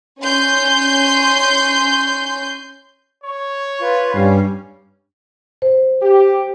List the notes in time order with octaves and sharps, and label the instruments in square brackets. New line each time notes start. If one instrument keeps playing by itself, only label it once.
[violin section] C#4 C6 G6
[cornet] C#5 [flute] C#6
[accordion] F4 [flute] B4
[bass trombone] G2 [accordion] G3 C#4 [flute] F5
[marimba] C5
[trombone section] G4